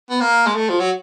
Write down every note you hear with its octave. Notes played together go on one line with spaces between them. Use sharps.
B3
A#3
G#3
A3
F3
F#3